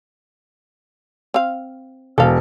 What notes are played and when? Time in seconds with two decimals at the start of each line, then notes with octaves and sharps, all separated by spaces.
1.34 C4 F5
2.18 E1 A4 F5